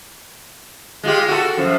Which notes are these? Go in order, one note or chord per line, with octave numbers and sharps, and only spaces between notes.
G#3 F4 G4
F#4 A4
F#2 F3